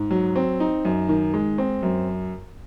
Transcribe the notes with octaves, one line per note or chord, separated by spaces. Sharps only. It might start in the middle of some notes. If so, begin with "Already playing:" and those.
Already playing: G#2
F#3
C4
D#4
F#2
D#3
G#3
C4
F#2